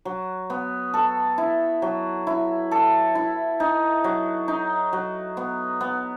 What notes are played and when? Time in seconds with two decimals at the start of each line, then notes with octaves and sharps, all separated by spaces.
0.05 F#3
0.50 B3
0.94 A4
1.38 E4
1.82 F#3
2.27 E4
2.71 A4
3.15 E4
3.60 D#4
4.04 F#3
4.48 D#4
4.93 F#3
5.37 B3
5.81 B3